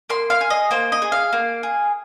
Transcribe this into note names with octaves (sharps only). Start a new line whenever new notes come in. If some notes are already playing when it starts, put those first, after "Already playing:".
A#3 C6
F5
G#4
D#5
A#3 C5
D#5
G#4
F5
A#3
G#4